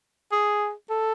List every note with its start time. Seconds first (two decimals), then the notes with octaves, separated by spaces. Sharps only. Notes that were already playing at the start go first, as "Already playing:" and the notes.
0.32 G#4
0.89 A4